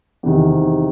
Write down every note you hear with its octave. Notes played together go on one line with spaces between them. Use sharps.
E2 C3 D#3